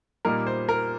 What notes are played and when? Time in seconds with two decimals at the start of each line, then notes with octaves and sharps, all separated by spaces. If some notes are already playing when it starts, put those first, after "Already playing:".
0.25 A#2 G3 A#3 D#4 A#4
0.47 C5
0.69 A#4